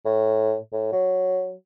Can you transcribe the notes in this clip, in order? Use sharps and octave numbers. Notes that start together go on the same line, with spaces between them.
A2
A2
F#3